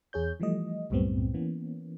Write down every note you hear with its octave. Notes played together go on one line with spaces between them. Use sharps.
E2 G#4 C#5 G6
E3 F3 G3 A3 D#5
C2 F#2 A2 G3 B3 C4
E3 A#3 B3 C#4